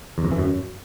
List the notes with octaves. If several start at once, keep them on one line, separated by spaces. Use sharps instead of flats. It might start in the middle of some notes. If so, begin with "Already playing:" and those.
E2
F2
E3
F#2